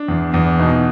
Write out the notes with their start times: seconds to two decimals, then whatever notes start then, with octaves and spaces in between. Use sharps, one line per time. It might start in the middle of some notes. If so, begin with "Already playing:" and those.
Already playing: D4
0.08 E2
0.34 E2
0.59 B2 D#4